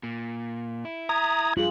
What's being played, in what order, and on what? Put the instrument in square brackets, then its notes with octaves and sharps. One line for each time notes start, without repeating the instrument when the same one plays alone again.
[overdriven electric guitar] A#2
E4
[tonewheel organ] A#5 D#6 [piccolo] G#6
[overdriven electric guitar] G2 [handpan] F4 G#4 [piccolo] F#7